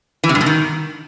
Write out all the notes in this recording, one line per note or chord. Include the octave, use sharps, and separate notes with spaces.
E3
C3
G2
B2
D#3